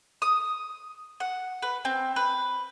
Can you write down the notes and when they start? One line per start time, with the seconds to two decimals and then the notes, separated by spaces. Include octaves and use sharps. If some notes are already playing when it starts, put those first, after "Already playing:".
0.22 D#6
1.20 F#5
1.62 B4
1.85 C4
2.16 B4